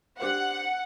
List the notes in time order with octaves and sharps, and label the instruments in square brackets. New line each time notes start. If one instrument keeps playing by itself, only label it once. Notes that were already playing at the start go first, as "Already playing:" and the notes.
[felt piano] D4 G4 C5 [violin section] F#5